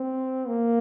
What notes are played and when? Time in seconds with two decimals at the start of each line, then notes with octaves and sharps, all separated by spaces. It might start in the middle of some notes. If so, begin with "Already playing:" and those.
Already playing: C4
0.47 A#3